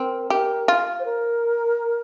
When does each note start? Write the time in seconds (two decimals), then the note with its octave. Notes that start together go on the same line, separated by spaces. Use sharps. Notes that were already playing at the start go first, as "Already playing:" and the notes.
Already playing: C4 A#4
0.30 G4 A#4
0.68 F4
0.99 C5
1.05 A#4